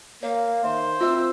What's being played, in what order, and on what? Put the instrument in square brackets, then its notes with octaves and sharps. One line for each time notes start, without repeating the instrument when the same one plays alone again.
[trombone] A#3 [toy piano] C#5 [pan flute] F5
[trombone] D#3 [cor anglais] C5 [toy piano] E5
[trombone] C4 [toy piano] F4 E5 [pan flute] E6